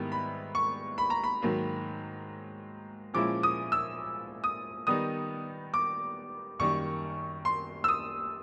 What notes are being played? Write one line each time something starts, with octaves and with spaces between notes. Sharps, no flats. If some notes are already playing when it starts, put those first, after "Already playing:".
Already playing: G#2 D#3 G3 B3 E4
B5
C#6
B5
A#5
B5
G#2 D#3 F#3 A#3
A#2 F3 G#3 C#4 E4 D6
D#6
E6
D#6
D#3 G3 B3 D#4 D#6
D6
F#2 D#3 G3 A#3 C#6
C6
E6
D#6